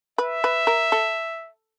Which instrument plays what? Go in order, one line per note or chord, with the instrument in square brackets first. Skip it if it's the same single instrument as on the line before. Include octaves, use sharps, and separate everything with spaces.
[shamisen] B4 [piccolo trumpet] E5
[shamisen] B4
A#4
A4